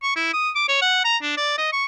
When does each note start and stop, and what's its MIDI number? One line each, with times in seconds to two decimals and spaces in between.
0.03 0.13 85
0.16 0.29 64
0.33 0.50 87
0.55 0.68 86
0.68 0.80 73
0.82 1.03 78
1.05 1.17 82
1.22 1.34 62
1.37 1.56 74
1.58 1.70 75
1.73 1.86 85